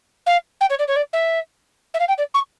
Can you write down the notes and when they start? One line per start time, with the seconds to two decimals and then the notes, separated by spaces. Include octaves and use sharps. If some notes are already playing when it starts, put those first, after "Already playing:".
0.26 F5
0.60 G5
0.70 C#5
0.79 D5
0.88 C#5
0.96 D5
1.13 E5
1.94 E5
1.99 F5
2.08 G5
2.18 D5
2.34 C#6